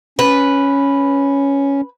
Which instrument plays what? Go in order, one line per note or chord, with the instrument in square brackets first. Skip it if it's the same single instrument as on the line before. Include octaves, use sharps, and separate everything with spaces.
[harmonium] C#4 [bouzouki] B4